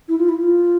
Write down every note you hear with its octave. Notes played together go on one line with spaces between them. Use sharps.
E4
F4
E4
F4